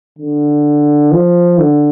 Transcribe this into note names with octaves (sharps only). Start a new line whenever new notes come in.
D3
F3
D3